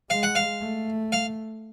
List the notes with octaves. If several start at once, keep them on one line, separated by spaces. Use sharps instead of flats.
G#3 F5
F#5
F5
A3
F5